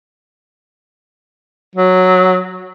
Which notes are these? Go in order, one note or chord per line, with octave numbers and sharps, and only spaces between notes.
F#3